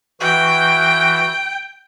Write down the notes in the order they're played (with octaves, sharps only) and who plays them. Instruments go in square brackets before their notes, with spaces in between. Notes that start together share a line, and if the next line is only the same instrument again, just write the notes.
[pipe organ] E3 F#4 [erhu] G5